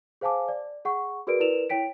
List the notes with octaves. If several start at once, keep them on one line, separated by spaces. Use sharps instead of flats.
G#4 C5 F5 G#5 A5 D6
D5
G#4 F#5 C#6
F#4 G#4 A#4 B4 D5 D7
E4 A#4 B4 D5 E7 F7
E4 C#5 G5 B6 D7